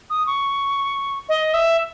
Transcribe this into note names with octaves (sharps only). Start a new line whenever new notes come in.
D#6
C#6
D#5
E5